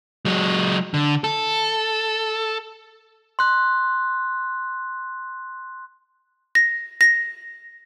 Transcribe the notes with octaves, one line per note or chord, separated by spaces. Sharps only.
F#3 G#3
D3
A4
C6 F#6
A#6
A#6